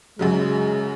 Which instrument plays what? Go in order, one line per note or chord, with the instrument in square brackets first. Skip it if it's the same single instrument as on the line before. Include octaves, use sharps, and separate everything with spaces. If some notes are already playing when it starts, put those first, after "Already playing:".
[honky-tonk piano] F#2 C#3 F#3 [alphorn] G#3